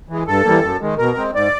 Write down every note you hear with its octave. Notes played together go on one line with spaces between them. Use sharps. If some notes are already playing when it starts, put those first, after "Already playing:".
E3 G#3
G2 A4
E3 G3 A#3
F#2
D#3 G#3
B2 A#4
G#3 C4
G#2 D5